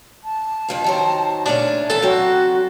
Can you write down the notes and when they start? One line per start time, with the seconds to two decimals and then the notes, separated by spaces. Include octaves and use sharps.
0.24 A5
0.68 F2 F3 F5
0.84 D#3 F#3 C5
1.46 A#2 A3 C#4 D4
1.90 C#3 E3 A4 A5
2.02 F#3 C4 F#4